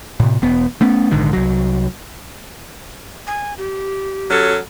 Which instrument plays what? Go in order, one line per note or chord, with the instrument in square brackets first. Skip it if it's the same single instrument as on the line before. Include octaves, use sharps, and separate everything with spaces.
[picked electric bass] A2 C3
E1 B3
A3 B3 C#4
A#1 G#2 D3 D#3
C2 F#3
[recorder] G#5
G4
[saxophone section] F#3 C#4 A4